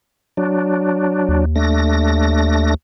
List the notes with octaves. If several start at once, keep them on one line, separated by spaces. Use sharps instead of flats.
F#3 D4
D#2
A3 D4 A#6